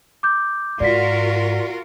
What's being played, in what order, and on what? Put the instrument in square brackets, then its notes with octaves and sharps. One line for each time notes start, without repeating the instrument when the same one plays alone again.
[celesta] D6 G6
[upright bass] G#2 [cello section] F4 F#4 A#4 [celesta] D5 B6